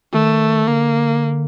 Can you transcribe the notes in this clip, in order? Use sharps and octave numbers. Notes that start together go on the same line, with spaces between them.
D#3 A3
D3 A#3